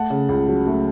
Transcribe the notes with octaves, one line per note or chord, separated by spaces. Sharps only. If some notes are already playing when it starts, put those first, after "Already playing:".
Already playing: A3 F#5 A5
C#3
C#2
F#3
A3